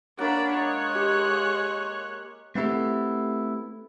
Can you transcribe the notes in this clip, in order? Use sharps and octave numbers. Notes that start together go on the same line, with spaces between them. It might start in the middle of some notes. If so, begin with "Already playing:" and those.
A#3 D4 A#4 C#5 F#5 B5
G#3 C#5 D#5 A#5 F#6
G4
A3 B3 C4 E4 G4 A4